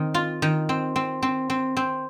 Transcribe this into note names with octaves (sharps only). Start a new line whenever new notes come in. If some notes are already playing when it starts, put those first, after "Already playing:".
Already playing: D#3 C4
F4
D#3
C4
C4
C4
C4
C4